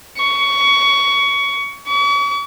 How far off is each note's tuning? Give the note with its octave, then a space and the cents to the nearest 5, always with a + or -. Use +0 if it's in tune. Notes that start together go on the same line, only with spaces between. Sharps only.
C#6 +20
C#6 +45